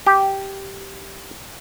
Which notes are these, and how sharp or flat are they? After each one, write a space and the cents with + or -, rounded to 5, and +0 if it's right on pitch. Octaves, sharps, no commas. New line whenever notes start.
G4 -5